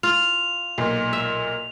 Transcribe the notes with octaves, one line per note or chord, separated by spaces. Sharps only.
F4 F7
B1 A#2
E5